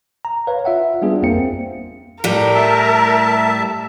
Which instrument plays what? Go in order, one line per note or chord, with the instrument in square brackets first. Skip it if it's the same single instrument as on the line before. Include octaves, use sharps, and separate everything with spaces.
[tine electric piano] A#5
B4 C#5 F5
F4 E5 F#5
G3 B3 D4 F4 G#4
A1 F2 A#3 C4 C#7
[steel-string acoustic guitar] A2 G3 [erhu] A#4
[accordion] E5 A5